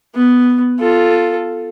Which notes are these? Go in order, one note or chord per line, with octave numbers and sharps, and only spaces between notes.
B3
F4 A4